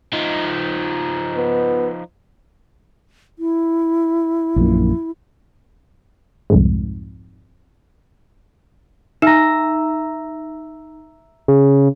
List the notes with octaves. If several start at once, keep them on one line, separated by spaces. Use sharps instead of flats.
F3 D#4
B3
E4
A#1 F#2 A#2
C2 F2 G#2
D#4 E5 A#5
C#3